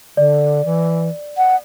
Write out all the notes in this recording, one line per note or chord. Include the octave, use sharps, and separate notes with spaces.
D3 D5
E3
F#5